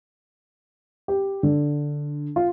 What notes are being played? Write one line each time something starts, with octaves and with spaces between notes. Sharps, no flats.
G4
D3
F4